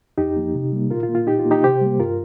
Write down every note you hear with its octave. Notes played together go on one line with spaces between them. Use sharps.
F2 D#4 G4
F3 A#3
C3
G3 A#3
A#2 F4 A#4
F4
A#3
F4
A#2 D#4 G4
F4
A#3
D#4 G4
C3 G4 C5
G3 A#3
G2 F4 A#4